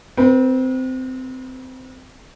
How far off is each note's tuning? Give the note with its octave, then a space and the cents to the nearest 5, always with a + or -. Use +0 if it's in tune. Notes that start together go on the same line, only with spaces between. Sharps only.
C4 -20 B4 -45